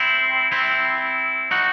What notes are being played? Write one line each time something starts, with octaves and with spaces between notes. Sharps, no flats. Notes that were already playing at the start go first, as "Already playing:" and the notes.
Already playing: C4 E4
C4 E4
D#4 F#4